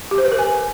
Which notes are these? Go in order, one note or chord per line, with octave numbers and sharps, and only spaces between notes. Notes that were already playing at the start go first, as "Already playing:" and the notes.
G4
C5
B4
A#4
G#5